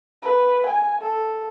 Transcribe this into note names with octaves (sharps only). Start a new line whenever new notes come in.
B4
G#5
A4